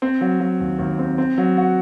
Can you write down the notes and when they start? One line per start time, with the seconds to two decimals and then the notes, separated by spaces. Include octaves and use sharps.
0.02 C4
0.21 F#3
0.40 F#3
0.60 D#2
0.79 D#2
0.99 C4
1.18 C4
1.38 F#3
1.57 F#4